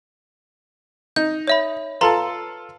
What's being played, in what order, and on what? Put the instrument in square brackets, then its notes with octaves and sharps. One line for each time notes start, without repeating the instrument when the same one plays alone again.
[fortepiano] D#4 [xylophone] G6
[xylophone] C#5 E5 B5
[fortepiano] F4 A4 A5 [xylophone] B4 A#5 C6